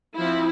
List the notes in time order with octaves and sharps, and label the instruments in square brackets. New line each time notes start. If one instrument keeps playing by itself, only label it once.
[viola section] F3 C4 E4